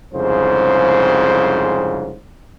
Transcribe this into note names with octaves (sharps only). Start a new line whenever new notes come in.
C2 F2 G#2 C#3 C5